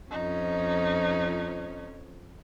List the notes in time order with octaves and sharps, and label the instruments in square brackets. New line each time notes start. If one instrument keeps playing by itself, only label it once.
[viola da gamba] F2 F3 C#4 [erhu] D#4